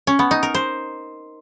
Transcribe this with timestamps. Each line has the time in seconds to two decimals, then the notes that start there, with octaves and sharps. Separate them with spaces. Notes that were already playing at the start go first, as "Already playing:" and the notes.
0.07 C#4
0.19 B3
0.31 D#4
0.43 A#4
0.54 C5